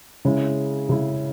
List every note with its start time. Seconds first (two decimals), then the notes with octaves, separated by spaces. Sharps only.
0.25 C#3 G#3 C#4 E4
0.89 C#3 G#3 C#4 E4